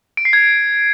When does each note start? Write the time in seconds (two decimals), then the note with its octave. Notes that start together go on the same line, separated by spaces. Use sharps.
0.17 D7
0.25 C7
0.33 G#6